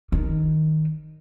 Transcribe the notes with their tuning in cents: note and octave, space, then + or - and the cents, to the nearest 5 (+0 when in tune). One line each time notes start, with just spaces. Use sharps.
D#3 +0